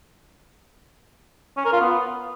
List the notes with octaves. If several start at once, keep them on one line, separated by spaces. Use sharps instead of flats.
C#4
A#4
F4
B3